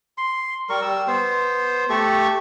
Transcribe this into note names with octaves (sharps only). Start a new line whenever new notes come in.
C6
G3 A#4 C#6
G3 E6
B3 C5
A3 G4 A4 C#6